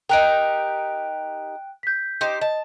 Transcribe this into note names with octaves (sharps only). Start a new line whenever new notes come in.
D#4 G4 A#4 G5 F#6 D7
G6 B6
D#4 G4 C5
D#5 A5